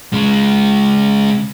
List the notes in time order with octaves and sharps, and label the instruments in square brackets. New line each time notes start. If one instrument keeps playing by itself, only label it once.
[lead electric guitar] C#3 G#3